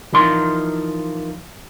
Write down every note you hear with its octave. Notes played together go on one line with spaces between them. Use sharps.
E3 F3 D#4 A#4 C6